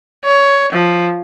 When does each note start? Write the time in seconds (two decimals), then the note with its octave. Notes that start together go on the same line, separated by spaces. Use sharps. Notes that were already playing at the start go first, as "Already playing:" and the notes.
0.25 C#5
0.72 F3